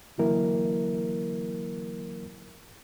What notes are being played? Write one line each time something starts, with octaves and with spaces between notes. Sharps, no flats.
D3 E3 F#3 A#3 E4 A#4